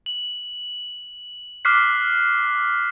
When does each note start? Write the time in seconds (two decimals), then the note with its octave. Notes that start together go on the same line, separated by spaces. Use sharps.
0.06 F#7
1.65 D6 F6 F#6 B6 C7